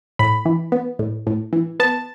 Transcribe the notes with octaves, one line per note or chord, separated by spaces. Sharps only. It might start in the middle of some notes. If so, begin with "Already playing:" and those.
A2 B5
E3
B3
A2
A2
E3
B3 A5